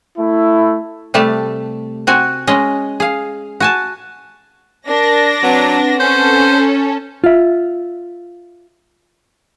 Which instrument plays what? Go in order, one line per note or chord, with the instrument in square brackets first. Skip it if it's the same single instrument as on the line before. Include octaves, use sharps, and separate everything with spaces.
[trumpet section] A3 E4
[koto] C3 G3 A3 A5
C4 F#4 G#5
G#3 C#4 D#5
G#4 F5
F#4 G#5 A5
[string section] D4 A#6 [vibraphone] A#4 D5
[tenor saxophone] F#3 [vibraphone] C4 B4 F#5
[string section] C#4 A4 [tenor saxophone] C5
[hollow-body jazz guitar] F4 E5